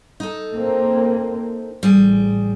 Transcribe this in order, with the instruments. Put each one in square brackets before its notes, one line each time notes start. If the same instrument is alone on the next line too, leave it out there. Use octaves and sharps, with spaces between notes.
[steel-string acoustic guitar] D#4 A4
[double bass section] A#3 C4
[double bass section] A1 [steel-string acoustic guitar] G3 G#4